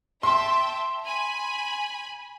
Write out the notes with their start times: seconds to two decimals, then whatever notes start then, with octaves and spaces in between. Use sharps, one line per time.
0.23 E5 G5 A5 C6
1.05 G#5 B5